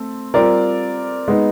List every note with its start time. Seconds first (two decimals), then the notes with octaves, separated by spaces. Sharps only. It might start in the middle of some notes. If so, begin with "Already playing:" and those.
Already playing: A3 C4 A4
0.34 G3 C4 F4 A#4 D5
1.28 G#3 B3 D#4